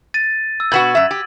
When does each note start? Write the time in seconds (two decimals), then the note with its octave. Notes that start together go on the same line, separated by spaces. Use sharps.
0.14 A6 D#7
0.60 E6
0.72 B2 B3 F#4 G#6 F#7
0.95 F#2 E5
1.11 G4